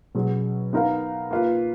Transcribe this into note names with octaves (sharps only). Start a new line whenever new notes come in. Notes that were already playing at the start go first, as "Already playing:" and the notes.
B2 F#3 C#4 G#4
B3 D#4 A#4 F5
A#3 F4 B4